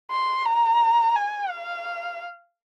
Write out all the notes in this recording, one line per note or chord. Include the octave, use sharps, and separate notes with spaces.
C6
A#5
G#5
F5